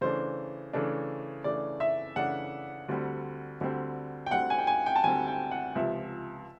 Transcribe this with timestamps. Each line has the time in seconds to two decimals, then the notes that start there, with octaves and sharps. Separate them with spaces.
0.01 C#3 E3 A3 D4 C5
0.73 C#3 E3 A3 D4
1.44 C#3 E3 A3 D4 D5
1.80 E5
2.16 C#3 E3 A3 D4 F#5
2.88 D2 D3 G3 C4
3.61 D2 D3 G3 C4
4.26 G5
4.31 D2 D3 G3 C4 F#5
4.50 G#5
4.59 G5
4.67 G#5
4.86 G5
4.96 A5
5.04 D2 D3 G3 C4 G#5
5.28 G5
5.51 F#5
5.75 C#2 C3 F3 E5